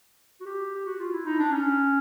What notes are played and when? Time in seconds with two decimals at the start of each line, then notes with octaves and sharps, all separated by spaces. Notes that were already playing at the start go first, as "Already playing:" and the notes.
0.40 F#4
0.46 G4
0.75 G4
0.85 F#4
0.99 F4
1.12 E4
1.26 D#4
1.39 D4
1.52 C#4